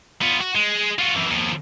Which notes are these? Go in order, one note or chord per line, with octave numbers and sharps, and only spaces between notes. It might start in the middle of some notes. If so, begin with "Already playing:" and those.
B3 F4
F#4
G#3
F4 F#4
F#2 E3
D#2 F3